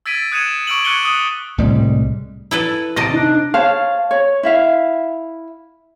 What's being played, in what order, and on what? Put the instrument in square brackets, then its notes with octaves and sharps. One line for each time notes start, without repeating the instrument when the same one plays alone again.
[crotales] E6 G#6 A6 B6 D7 D#7
D#6 F#6 G#6 C#7 D#7 E7
C#6 D6 E6 D7 D#7 F#7
D6 F#6 G#6 C#7 D#7 G7
D#6 F#6 D#7
[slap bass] C2 A2 G3 G#3
[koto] E4 A4 B4
[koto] C3 D#5 A5 [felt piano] A#6 D7
[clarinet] D4 [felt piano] D#4
[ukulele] C5 C#5 F5 A5
C#5
E4 E5 F5